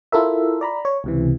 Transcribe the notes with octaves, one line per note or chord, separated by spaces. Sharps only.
E4 F4 A4 A#4 E5
D5 A#5 B5
C#5
C#2 C3 E3